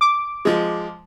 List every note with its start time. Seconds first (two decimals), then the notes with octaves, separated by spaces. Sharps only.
0.01 D6
0.45 F3 G#3